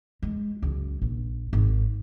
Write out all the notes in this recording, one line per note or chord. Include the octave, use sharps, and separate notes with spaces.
G#3
C#2 F#2
A#1
G#1